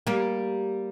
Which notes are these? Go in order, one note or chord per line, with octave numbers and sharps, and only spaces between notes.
G3 A#3